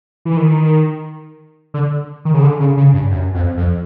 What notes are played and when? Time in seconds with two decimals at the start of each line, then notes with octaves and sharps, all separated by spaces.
0.25 E3
0.37 D#3
1.74 D3
2.25 D#3
2.34 C#3
2.42 D3
2.60 C#3
2.77 C#3
2.94 G2
3.11 F#2
3.34 F2
3.57 F2